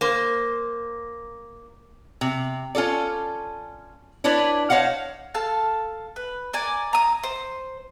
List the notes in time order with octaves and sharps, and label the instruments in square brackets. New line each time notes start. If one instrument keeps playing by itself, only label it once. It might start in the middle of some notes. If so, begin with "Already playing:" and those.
[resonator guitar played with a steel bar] A#3 C5
C3
C#4 F4 A4 D5
D4 E4 B4 C#5 D5
C5 C#5 D#5 F5 F#5
[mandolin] A4 F5 A5
B4
A#4 D5 G#5
A#5 D#6
C5